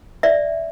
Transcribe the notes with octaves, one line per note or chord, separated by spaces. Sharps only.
D5 E5